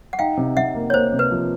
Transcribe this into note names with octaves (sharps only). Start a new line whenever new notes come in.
F#5
D#4 F5 G5
C3
C3 E5 F#5
A#3
C#5
A#3 C5
C3
B4
F3